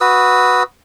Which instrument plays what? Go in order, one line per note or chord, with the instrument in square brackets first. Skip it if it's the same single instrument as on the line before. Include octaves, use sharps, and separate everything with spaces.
[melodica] F#4 B4 D#6 E6